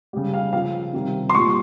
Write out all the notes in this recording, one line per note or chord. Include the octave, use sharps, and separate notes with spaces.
C#3 G3
F5
C#3 F3 F5
C3 D#3 G3
C6
A#2 G3 C#6